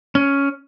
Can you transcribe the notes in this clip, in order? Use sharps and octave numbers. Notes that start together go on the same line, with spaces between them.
C#4